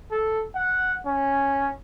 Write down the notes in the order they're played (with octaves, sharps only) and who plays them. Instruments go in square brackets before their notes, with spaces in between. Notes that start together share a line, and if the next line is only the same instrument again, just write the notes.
[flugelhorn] A4
F#5
C#4